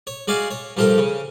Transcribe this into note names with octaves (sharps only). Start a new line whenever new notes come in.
C#5
G#3 F#4 D5 F5 G#5
C#5
G2 F3 G4 A4 A#4
C#3